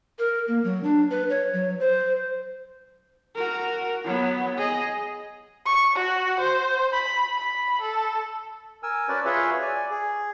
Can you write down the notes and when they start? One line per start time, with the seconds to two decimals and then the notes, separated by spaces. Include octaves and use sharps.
0.19 A#4
0.48 A#3
0.64 F#3
0.84 D4
1.11 B4
1.30 C#5
1.54 F#3
1.80 C5
3.35 F#4 A#4
4.04 F#3 B3
4.58 G#4 D#5
5.66 C#6
5.96 F#4
6.40 C5
6.93 B5
7.38 B5
7.81 A4
8.83 A#4 G#5 E6
9.08 C#4 F#4 A#4 B4 D5 A5
9.25 F4 F#4 G#4 B4 C#5 E5
9.62 D5 G#5
9.90 G#4